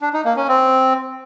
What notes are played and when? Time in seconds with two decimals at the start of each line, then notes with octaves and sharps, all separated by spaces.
0.02 D4
0.13 D#4
0.25 A#3
0.37 C#4
0.48 C4